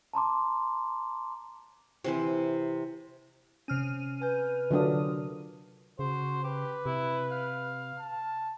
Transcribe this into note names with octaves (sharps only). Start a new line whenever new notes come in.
A5 A#5 C6 D6
C3 E3 C5
C3 C#4 F6 D#7
B4 G#5 G6
D3 F#3 D4 F4 A#4 D#6
C#3 F#4 C5
G4 B4
C3 E4
F5
A5